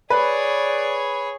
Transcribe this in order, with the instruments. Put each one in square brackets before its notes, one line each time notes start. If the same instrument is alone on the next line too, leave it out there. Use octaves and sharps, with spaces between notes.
[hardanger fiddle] G#4 C#5 [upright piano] B4 [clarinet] D5